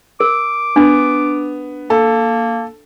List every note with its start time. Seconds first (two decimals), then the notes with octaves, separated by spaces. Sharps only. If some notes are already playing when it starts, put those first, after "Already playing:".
0.20 A#4 D6
0.76 B3 D4
1.90 A#3 A4